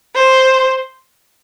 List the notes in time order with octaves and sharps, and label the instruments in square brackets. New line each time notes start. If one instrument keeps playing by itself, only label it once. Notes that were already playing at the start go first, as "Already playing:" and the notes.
[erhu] C5